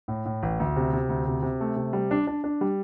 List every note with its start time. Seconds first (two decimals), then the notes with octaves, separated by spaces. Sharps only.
0.08 A2
0.26 A2
0.43 A1
0.60 D2
0.76 C3
0.93 C3
1.09 D2
1.27 C3
1.43 C3
1.61 A3
1.76 C3
1.93 G3
2.11 D4
2.27 D4
2.44 D4
2.61 G3